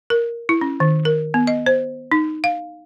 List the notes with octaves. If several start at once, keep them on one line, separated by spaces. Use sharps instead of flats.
A#4
E4
C#4
D#3
A#4
B3
D#5
C5
D#4
F5